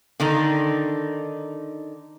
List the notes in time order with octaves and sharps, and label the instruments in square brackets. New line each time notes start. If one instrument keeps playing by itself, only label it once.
[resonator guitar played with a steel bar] D3 D#3 D#4